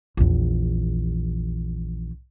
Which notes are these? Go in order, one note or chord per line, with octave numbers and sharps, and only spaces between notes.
A#1 E2